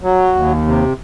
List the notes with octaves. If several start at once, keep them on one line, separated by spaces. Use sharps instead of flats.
F#3
D#2
C3